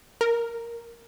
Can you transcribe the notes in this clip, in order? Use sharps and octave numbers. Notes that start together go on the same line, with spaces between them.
A#4